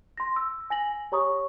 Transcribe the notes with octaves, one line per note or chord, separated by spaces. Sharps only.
C6 A#6
E6
G#5 A#6 F#7
G4 C#5 A#5 C#6 D#6